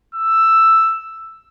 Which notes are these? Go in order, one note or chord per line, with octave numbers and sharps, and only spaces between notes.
E6